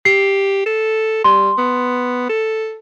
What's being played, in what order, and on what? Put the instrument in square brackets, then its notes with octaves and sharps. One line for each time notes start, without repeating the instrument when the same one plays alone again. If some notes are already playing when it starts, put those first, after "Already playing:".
[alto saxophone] G4 [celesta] C7
[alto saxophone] A4
[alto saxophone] G3 [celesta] C6
[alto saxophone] B3
A4